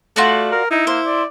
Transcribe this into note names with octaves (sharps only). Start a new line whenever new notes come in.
A3 F4 F#4 D5
A#4
D#4 E4
A#3 C5
D5